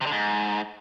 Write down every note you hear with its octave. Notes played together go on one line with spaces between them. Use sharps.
C3
D3
G#2